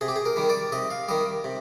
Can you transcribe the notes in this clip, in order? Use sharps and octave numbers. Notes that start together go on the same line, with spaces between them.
C3 G#4
G4
G#4
A#4
D#3 G3
D5
C3 D#5
F5
D#3 G3 D#5
C3